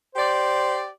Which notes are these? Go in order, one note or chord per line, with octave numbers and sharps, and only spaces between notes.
G4 C5 D5